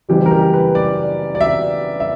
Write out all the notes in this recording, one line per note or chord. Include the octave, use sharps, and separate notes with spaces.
F#1 F#2 E3 G3 G4
A#4
G4
B4
D5
D5
E5
E5